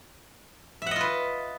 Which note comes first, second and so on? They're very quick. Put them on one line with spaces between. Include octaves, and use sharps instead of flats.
E5 F#5 D#5 F4 B4